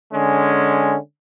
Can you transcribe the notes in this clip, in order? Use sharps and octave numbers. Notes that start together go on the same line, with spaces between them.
D3 G#3 C#4